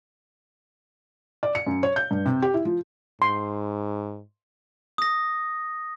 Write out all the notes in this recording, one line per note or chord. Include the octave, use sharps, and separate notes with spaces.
D5
C#7
F#2
C#5
G6
G2
C3
G4
E4
F3
G#2 C6
D#6 A#6